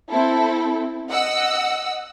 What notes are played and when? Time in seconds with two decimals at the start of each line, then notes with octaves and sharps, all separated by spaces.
0.10 C4 E4 A4
1.10 D#5 F#5 E6